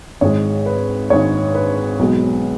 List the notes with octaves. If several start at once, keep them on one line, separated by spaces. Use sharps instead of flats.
G#1 G#2 G#3 C#5
B4
G#1 G#2 G#3 C#5
B4
B1 B2 G#3